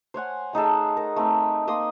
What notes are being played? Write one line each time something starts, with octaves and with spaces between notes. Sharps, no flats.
C5 C#5 F#5 G#5
A3 D#4 G#4 A4
A#4
A3 C4 D#4
A#3 C6 D#6